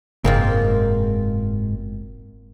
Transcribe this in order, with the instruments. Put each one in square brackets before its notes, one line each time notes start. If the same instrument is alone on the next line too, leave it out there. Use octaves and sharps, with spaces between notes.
[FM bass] F#1 [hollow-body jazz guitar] G#2 B2 G#3 [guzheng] A#3 C4 F4